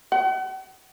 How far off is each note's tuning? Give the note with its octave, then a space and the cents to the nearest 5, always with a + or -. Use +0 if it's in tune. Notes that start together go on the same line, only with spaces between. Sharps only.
F#5 +40